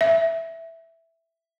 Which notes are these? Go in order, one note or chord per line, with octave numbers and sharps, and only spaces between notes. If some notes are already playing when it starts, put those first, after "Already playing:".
E5